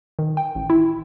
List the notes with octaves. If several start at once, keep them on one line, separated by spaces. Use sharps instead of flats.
D#3
G5
A1
E4